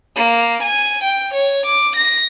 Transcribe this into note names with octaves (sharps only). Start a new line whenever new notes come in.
A#3
G#5
G5
C#5
D6
A#6